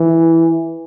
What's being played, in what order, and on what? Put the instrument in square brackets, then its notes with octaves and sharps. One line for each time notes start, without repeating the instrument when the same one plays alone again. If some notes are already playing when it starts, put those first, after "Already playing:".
Already playing: [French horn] E3